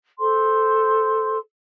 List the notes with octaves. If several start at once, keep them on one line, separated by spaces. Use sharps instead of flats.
A4 C5 C6